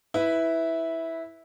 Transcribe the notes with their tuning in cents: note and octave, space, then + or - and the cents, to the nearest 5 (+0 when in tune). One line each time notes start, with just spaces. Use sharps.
E4 -10 B4 +5 E5 -10